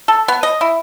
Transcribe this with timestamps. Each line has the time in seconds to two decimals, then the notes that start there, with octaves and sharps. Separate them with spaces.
0.08 A4
0.28 B3
0.43 D#5
0.61 E4